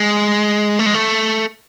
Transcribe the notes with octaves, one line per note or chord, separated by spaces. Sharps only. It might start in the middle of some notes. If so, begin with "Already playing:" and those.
Already playing: G#3
A3
G#3
A3